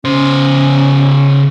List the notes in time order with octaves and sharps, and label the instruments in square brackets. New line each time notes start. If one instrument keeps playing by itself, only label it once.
[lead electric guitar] C#3 C5 [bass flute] C#4